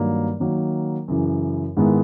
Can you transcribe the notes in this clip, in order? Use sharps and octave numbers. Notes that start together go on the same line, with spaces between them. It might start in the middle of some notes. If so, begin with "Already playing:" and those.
Already playing: G2 D#3 F#3 A#3
D#3 F#3 A#3
F#2 C#3 E3
G#2 D#3 G#3 B3 E4